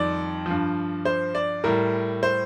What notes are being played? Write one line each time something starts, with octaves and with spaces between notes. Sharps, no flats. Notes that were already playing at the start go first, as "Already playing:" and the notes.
Already playing: F2 D#3 G3 D5
G2 F3
C5
D5
A2 G3 A#4
C5